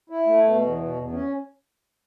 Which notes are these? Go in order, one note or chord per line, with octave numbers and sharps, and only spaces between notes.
E4
A3
B2
E2
B2
E2
C#4